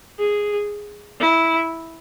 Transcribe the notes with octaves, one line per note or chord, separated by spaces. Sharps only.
G#4
E4